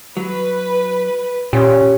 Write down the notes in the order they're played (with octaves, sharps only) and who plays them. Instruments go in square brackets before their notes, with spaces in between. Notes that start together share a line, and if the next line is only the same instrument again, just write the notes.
[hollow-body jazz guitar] F#3 [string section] B4
[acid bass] A#2 [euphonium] C#4 [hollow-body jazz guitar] G4